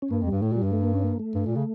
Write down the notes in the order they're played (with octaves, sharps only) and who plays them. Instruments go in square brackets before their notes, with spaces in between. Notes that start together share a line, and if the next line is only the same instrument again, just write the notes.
[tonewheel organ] C#4
[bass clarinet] G2 [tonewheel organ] A#3
[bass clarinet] F2
[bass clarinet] G2 [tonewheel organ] G3
[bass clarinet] A2 [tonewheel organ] A3
[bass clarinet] A#2
[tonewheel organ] G3
[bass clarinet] G2
[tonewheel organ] A3
A#3
C#4
A#3
A3
[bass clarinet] G2
A#2
C#3